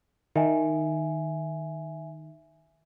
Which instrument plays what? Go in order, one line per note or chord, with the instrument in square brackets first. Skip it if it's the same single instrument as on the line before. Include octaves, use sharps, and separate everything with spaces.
[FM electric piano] D#3 [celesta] E5 G#5